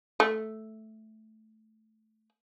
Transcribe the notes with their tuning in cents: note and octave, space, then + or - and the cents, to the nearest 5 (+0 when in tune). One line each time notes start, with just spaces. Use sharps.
A3 -5